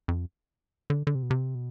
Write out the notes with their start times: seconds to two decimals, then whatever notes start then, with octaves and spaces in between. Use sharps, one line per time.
0.08 F2
0.90 D3
1.07 D3
1.15 C3
1.23 B2
1.31 C3
1.55 B2